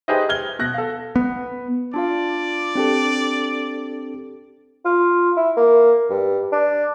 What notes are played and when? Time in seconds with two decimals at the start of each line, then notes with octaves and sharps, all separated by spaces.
0.08 D#4 G4 G#4 B4 C5 D#5
0.29 F6 G#6 G7
0.59 B2 F#6 A#6
0.74 A4 F5
1.16 B3
1.94 D4 F4 D5 F5
2.76 C4 D4 G4 A4
4.85 F4
5.36 E4
5.57 A#3
6.10 G2
6.52 D4